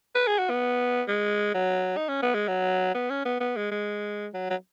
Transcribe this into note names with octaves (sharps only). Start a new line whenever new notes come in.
B4
G#4
F#4
B3
G#3
F#3
D#4
C#4
B3
G#3
F#3
B3
C#4
B3
B3
G#3
G#3
F#3
F#3